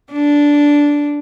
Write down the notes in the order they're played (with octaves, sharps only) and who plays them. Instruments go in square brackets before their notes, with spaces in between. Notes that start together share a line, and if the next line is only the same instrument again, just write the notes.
[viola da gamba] D4